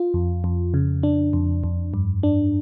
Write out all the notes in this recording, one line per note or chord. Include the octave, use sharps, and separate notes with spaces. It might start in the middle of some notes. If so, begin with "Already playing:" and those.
Already playing: F4
F2
F2
C#3
D4
F2
F2
G2
D4